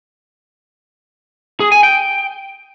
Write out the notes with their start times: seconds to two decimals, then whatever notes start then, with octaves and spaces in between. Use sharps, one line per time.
1.60 G#4
1.72 G#5
1.83 G5